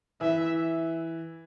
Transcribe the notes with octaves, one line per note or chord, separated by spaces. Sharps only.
E3 E5